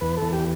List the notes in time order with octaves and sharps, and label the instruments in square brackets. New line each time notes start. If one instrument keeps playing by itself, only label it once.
[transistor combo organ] E2 B4
A4
E2
G4